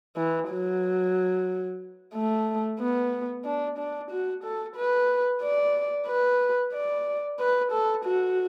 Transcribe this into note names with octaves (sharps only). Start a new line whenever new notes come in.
E3
F#3
A3
B3
D4
D4
F#4
A4
B4
D5
B4
D5
B4
A4
F#4